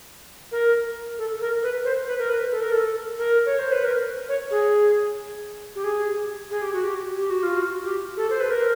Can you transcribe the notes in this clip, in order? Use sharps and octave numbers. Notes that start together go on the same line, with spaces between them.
A#4
A4
A#4
B4
C5
B4
A#4
B4
A4
A#4
A4
A#4
C#5
C5
B4
A#4
C#5
G#4
G4
G#4
G#4
G4
F#4
G4
G4
F#4
F4
F#4
G4
A4
C5
B4
A#4